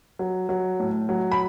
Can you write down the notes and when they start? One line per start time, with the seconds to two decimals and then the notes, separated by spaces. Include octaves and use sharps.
0.19 F#3
0.49 F#3
0.80 A2
1.09 F#3
1.31 B5